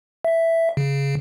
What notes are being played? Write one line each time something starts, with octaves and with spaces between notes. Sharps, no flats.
E5
C#3